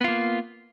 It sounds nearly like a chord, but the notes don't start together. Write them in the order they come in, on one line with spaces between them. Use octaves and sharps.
B3 F4 A#3